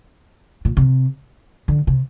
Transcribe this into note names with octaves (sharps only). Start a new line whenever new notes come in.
A#2
C3
D3
C3